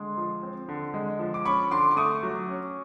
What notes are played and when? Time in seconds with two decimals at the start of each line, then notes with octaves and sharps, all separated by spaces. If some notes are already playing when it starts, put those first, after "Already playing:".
Already playing: D3 G#3 C6
0.17 F3
0.43 C4
0.69 D3
0.94 G#3
1.19 F3
1.34 D6
1.45 C#4 B5 C#6
1.71 D3 C6 D6
1.91 D6
1.97 A3 C#6 D#6
2.23 F#3
2.48 C#4